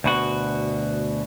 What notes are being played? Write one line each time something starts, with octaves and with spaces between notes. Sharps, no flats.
D2 B2 F#4